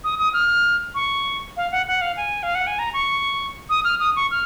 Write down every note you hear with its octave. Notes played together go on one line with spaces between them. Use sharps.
D#6
D#6
F6
C#6
F5
F#5
F#5
F5
G#5
F5
F#5
G#5
A#5
C#6
D#6
F6
D#6
C#6
F6